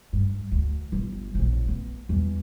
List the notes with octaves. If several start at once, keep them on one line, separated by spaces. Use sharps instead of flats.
G2
D2
G1
A#1 C#3
B3
E2 G3